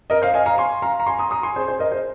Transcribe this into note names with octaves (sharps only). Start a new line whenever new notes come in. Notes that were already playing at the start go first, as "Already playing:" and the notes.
A#4 D#5
C5 F5
D#5 G#5
F5 A#5
G#5 C6
F5 A#5
A#5
G#5 C6
A#5 D#6
A#5 D#6
G#5 C6
G#4 C5
G#4 C5
A#4 D#5
G#4 C5